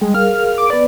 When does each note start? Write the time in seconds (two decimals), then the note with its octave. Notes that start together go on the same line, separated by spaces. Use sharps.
0.01 G3 G#3
0.14 G#4 A#4 F5 F6
0.58 D6
0.70 B3 B4 D5